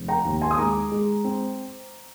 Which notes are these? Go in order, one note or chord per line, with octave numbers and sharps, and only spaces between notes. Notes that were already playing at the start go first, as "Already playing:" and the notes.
Already playing: F1
G5 A#5
D#2
G#5 C6
D#6
G#3 A#5 D6
G#3
C4